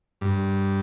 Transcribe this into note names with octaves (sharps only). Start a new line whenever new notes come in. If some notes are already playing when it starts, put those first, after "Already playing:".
G2